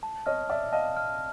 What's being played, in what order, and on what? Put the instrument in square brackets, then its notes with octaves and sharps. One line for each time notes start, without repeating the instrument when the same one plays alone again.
[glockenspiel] A5
[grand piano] C#5 D#5 [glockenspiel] F6
[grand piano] D5 E5 [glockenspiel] A5
[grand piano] D#5 F5 [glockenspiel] A5
[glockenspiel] F6